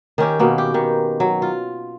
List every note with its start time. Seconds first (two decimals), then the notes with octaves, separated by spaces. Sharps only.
0.18 D#3 C#4 G4
0.39 B2 A#3 B3
0.58 G4
0.74 D#3
1.20 F#3
1.42 F4